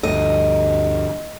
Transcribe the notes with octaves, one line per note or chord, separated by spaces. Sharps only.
D2 G2 D#5